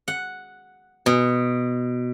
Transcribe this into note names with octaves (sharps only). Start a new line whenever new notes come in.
F#5
B2